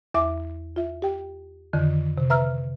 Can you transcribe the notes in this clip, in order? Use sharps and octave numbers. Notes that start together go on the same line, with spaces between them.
E2 E5 D6
F4 E5
G4 G5
F2 D3 D#3
C3
B4 E5 A#5 E6 F6